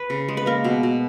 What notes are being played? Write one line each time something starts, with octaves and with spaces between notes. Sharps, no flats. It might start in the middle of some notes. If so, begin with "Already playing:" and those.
Already playing: B4
C#3
G#3
B4
A#3 A#4
B2
B2